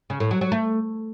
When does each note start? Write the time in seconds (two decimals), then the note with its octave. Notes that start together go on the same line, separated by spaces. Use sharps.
0.10 C#3
0.20 A2
0.31 F#3
0.41 F#3
0.52 A3